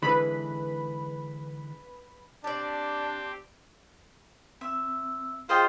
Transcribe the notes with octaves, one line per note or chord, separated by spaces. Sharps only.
D3 E3 G#3 B4 B5
C4 D4 G4 D5 A5
C4 E5 E6
F4 G#4 C5 D#5 F5 G5